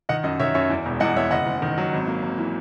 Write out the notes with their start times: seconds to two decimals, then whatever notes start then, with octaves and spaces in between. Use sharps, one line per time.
0.09 D#3 D#5 F#5
0.24 F#2 D#5
0.40 D#3 C#5 E5
0.54 F#2 C#5 E5
0.70 E2
0.86 E1
1.00 E2 D#5 F#5
1.16 E2 C#5 E5
1.31 F#1 D#5 F#5
1.47 F#1
1.62 D#3
1.78 F#3
1.93 G#1
2.07 A#3
2.23 G#1
2.38 E3